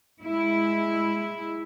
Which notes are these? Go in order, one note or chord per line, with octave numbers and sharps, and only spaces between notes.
G#3 E4